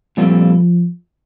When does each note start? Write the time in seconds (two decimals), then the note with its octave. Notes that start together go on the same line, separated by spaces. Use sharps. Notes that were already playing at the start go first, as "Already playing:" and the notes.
0.17 A#2 F3 G3 C4 F4 A4